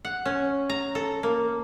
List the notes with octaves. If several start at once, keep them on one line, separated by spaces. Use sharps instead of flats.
F#5
C#4
A#5
A4
A#3